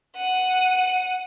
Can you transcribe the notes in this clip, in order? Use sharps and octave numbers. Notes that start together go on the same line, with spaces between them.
F#5 D#7